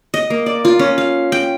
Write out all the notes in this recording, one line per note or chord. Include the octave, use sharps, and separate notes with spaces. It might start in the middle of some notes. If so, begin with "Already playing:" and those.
D#5
A#3
D5
F4
C#4
F5
G5